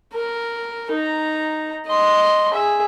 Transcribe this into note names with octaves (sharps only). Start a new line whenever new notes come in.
A#4
D#4 A#5
D#5 C6
G#4 E5